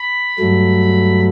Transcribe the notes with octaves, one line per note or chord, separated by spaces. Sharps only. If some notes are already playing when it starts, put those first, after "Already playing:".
Already playing: B5
G2 F#3 A3